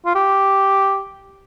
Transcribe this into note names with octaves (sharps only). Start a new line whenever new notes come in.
F4
G4